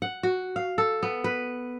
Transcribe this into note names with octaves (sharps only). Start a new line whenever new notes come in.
F#5
F#4
F5
A4
B3
B4